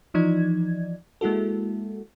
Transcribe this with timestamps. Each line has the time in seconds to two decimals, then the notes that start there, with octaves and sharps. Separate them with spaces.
0.14 E3 F3 D#4 D5 G#6
1.21 G#3 A#3 E4 F#4 A4